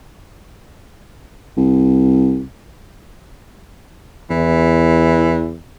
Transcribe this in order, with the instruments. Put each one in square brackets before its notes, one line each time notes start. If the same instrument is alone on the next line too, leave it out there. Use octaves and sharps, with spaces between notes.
[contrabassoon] C2
[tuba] E2 [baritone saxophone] E3